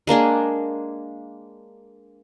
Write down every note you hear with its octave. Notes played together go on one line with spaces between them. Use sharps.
G#3 A#3 D4 G#4